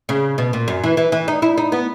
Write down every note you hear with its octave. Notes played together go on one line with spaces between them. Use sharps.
C#3
B2
A#2
F#2
E3
E3
E3
D#4
E4
D#4
B3